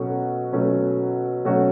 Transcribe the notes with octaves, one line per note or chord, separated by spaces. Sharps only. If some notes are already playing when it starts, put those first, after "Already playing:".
Already playing: B2 F#3 A3 C#4 F#4
B2 F#3 A3 C#4 F#4
B2 F#3 A3 C#4 F#4